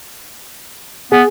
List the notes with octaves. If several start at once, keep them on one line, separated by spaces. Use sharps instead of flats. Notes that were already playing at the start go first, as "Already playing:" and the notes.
B3 G#4